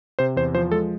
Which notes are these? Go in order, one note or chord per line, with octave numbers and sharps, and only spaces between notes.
C3 C5
E2 C5
F3 C5
G#3 A4